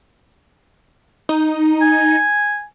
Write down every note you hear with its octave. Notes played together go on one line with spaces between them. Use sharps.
D#4
G#5